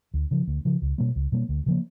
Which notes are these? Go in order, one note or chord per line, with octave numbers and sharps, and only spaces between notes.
D2
C#3 F3
D2
C#3 F3
C#2
B2 G3 A#3
C#2
B2 G3 A#3
D2
C#3 F3 A#3